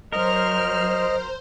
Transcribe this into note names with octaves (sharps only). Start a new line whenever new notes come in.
F#3 A#4 C5 D#5 F6